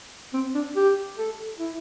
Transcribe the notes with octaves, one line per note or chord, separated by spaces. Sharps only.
C4
D4
G4
A4
E4